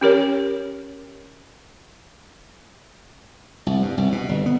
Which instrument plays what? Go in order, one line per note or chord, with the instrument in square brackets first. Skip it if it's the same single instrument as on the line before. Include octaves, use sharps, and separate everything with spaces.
[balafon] C#4 G4 A#4 C#5
[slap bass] C2
G2
C2
B2
G1
B3